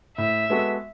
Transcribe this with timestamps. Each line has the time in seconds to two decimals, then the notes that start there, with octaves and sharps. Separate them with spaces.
0.18 A2 E5
0.50 G#3 B3 F#4 A4